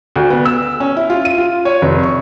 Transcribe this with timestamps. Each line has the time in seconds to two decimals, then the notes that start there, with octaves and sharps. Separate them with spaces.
0.16 D2
0.30 B3
0.45 E6
0.80 C#4
0.97 E4
1.10 F4
1.25 D#7
1.38 F4
1.65 C#5
1.82 F1
2.03 C#6